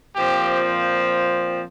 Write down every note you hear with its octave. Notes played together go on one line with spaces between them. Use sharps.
A#2 F3 C4 G4